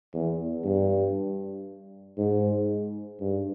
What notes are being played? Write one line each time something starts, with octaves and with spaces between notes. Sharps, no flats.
E2
G2
G#2
G2